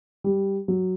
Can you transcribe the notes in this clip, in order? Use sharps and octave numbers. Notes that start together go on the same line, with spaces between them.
G3
F#3